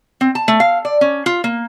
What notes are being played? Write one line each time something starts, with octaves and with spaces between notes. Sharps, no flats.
C4
A5
A3
F5
D5
C#4
F4
A#3